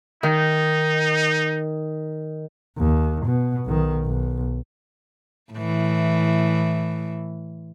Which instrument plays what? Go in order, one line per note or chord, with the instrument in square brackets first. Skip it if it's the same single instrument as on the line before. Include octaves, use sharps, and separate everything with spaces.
[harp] D#3 [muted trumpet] D#4
[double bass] D#2
B2
B1 D#3
B1
[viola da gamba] A2 E3